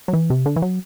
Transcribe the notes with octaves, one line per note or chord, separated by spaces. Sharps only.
F#3
E3
C3
D3
E3
F#3